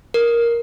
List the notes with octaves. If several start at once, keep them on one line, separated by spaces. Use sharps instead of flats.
A#4